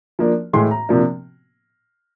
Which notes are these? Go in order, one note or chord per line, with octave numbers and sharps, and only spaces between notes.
F3 A#3 D4
A2 E3 G#3 C6
A#5
C3 F3 A#3 D4